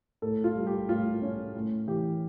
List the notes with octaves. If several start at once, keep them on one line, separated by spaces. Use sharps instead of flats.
A2 A4
F4
G3
G4
A2 F4
C#4
A2
E3 G4